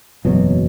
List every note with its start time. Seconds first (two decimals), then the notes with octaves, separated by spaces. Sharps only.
0.25 F#1 E2 B2 F#3